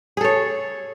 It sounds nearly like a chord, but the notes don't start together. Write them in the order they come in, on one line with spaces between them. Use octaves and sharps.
G#4 A4 C#5